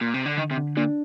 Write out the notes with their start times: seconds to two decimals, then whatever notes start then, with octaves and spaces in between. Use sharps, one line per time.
0.01 A#2
0.14 C3
0.26 D3
0.38 D3 D#3
0.51 C3
0.57 D3
0.77 A#2 D4